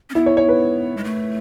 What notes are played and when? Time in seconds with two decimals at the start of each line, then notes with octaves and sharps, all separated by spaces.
0.10 C#4
0.15 B3 E4
0.26 C#5
0.37 C#5
0.49 B4
0.97 G#3
1.04 A3